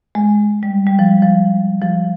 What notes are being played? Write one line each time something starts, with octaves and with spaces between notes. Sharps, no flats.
G#3
G3
G3
F3
F3
F3